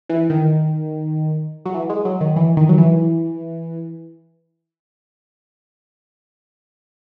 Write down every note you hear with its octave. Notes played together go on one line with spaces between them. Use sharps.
E3
D#3
F#3
E3
G#3
F#3
D#3
E3
D#3
F#3
E3